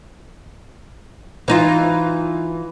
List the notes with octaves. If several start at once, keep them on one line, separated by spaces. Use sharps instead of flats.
E3 D#4 F4